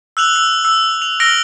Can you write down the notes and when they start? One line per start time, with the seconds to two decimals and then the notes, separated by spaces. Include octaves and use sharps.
0.17 E6 F#6 F7 F#7
0.36 E6
0.65 E6
1.02 F7
1.20 E6 F6 A#6 D7 F#7 G7